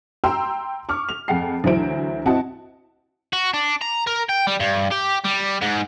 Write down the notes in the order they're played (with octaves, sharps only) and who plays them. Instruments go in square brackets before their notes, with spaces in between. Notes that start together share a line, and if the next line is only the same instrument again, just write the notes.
[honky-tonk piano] G5 A#5 C6 E6
C#6 D6 F6
F7
F2 G#4 F#5 G5 C7
D2 E3 F#3 E4 C5 D7
C4 E4 F#4 D#5 F#5 A5
[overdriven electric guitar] F#4
D4
A#5
A#4
G5
G3
G2
G4
G3
G#2